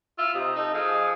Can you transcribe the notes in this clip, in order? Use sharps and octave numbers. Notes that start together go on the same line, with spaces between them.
F4 E5
C3 D#4
D#4 A4
F3 G#4